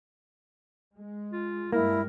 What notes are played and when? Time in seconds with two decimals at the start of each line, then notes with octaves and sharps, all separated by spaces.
0.97 G#3
1.32 F4
1.72 G2 G3 G#3 A#3 E4 A#4